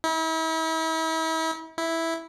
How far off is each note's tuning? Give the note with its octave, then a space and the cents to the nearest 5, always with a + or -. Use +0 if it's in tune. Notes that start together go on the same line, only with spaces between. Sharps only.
E4 -40
E4 -5